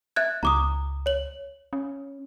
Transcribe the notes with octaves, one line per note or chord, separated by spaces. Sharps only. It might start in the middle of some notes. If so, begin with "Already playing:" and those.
E5 F#6 G#6
C#2 A#5 D6 D#6
C#5 F#7
C#4